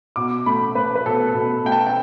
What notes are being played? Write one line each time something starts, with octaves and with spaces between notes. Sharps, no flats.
B2 D6
A3 B5
A3 B4
B4
B2 A4
A4
B2
A3 G5
A5
G5